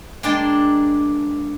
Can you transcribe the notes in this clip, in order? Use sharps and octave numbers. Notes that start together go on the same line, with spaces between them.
G#3 A#3 D4 G5 A5